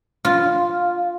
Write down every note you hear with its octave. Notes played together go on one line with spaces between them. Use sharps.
F4